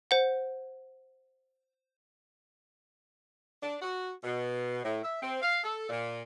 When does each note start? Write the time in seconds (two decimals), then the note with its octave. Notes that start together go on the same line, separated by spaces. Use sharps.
0.11 C5 F#5
3.63 D4
3.82 F#4
4.24 B2
4.84 A2
5.03 E5
5.22 C4
5.42 F5
5.64 A4
5.89 A#2